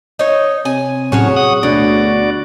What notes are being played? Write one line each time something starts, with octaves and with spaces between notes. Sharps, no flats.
D#4 C#5
C3 G#5
A2 F#3 C#4 F#4 G#4 C#5
F#5 D#6
D2 B2 F#4 D5